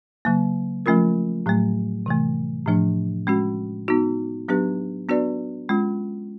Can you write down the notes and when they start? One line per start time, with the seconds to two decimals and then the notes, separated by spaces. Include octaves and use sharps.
0.25 C#3 F#3 A#3
0.86 F3 A3 C#4 F4 A#4
1.46 A2 F#3 A3
2.06 C3 E3 A3
2.66 A2 F3 A3 D4
3.27 G#3 C#4 F#4
3.88 B3 D#4 F#4
4.48 F#3 B3 D4 G4 B4
5.09 B3 D4 F#4 B4 D5
5.69 G#3 C#4 F4